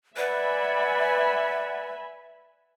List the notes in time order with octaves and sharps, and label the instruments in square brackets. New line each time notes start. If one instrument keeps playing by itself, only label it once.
[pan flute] B4 [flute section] D5 F#5 [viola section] E5 G#5 B5